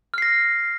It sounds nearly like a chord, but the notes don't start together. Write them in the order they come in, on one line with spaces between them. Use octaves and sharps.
F6 C7 A#6